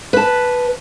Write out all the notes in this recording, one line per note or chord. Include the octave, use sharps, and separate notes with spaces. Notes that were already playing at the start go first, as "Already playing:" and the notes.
B4 A5